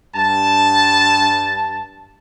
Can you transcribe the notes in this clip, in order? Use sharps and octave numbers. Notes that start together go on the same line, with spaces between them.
G2 A5